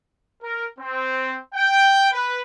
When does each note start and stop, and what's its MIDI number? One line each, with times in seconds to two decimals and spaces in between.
0.43 0.65 70
0.79 1.37 60
1.54 2.11 79
2.11 2.41 71